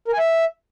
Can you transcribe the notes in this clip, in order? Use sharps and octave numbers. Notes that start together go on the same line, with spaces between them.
A#4
G#5
E5